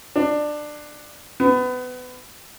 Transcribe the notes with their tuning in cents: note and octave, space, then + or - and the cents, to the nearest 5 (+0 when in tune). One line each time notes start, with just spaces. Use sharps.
D4 +20
B3 +25